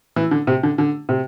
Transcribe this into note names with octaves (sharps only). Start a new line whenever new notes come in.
E3
D3
C3
D3
D3
C3